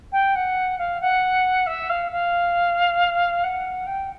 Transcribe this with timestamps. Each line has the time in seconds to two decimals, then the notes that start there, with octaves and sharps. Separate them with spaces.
0.12 G5
0.35 F#5
0.78 F5
1.01 F#5
1.66 E5
1.89 F5
2.11 F5
3.44 F#5
3.87 G5